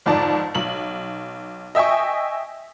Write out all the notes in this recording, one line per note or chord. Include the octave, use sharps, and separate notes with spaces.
G1 F2 G#2 D5 A5
B1 F#7
D#5 E5 G5 G#5 C#6